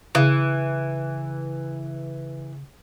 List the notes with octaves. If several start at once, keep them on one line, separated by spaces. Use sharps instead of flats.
C#3 E3